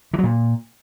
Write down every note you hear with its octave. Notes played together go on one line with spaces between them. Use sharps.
E3
F#3
A#2